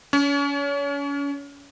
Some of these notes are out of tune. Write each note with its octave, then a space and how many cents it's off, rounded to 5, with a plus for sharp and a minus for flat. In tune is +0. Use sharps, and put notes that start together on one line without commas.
C#4 +35 C#5 +30